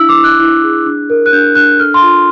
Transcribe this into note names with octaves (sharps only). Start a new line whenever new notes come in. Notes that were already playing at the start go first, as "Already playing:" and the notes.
Already playing: D4 E4 E6
D6
E4
F#6
E4
G#4
D4
A#4
F#6
D4 G6
D4 F#6
A4 F6
C6
F4